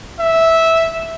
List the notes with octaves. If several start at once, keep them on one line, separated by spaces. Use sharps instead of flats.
E5